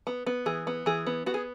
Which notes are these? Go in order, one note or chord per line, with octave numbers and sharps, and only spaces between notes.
B3
B3
E3 G#4
B3
E3 G#4
B3
B3 F#4
G#4